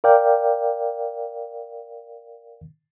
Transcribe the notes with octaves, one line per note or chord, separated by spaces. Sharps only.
A#4 D5 F5 G5